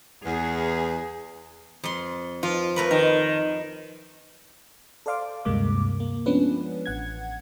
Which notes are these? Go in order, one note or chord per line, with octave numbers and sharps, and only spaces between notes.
E2 G#4
F2 C6
F3 F4
A3 A#4 B4
D#3 A#4
A4 C5 D5 F5 C6 D6
D2 G2 C3 G#3 A#3 D6
A#3
F3 G#3 B3 C#4 D4 B4
A1 F#5 G#6